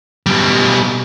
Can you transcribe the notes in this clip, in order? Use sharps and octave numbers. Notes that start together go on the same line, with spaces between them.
B2 G3